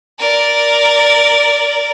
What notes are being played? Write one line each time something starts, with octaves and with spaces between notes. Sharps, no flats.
A#4 D5